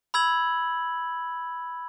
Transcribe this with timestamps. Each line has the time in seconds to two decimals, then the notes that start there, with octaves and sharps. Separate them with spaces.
0.14 B5 E6 G#6 F#7